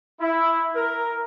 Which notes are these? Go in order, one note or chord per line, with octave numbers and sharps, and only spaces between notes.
E4
A#4